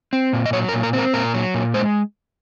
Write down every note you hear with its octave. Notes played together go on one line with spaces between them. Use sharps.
C4
A#2
D#5
F#3 C#5
A#4
A#2
A#4
C4
A#4
A#2 A#4
F#3
A#2
G#3 C5